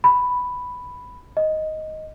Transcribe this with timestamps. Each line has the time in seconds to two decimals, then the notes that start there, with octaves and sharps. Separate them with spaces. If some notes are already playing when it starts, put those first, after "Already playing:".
0.04 B5
1.37 D#5